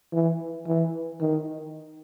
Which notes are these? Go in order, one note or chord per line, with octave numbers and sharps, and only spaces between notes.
E3
E3
D#3